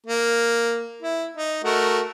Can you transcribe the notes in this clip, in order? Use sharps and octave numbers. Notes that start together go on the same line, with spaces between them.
A#3
E4
D#4
A3 F#4 A#4